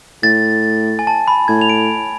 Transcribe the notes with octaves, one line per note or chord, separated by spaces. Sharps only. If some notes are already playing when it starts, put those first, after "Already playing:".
A2 A6
G#5
A5
B5
A2 G#6
F7
D7